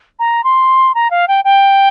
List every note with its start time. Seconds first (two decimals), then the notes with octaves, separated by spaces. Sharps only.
0.19 A#5
0.44 C6
0.95 A#5
1.11 F5
1.28 G5
1.45 G5